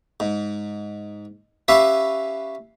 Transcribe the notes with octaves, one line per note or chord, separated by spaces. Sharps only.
G#2
C#4 G4 B4 E5 F5